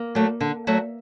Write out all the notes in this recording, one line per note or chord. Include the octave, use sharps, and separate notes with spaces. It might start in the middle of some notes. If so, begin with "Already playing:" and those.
Already playing: A#3
F#3 A3
D3
F#3 A3